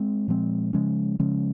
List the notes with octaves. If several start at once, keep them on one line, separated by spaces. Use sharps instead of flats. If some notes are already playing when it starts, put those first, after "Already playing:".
Already playing: G#3 C4
A#2 F3 G#3 C4
C#3 F3 G#3 C#4
C#3 F3 G#3 C#4